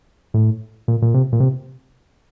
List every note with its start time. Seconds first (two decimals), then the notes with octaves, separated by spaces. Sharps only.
0.34 A2
0.88 A#2
1.02 A#2
1.14 C3
1.33 A#2
1.40 C3